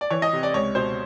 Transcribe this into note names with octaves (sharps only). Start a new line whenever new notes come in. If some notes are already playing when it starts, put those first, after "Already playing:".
D5
E3 C#5
D#5
C3
D5
C#2 C#5
B2 C5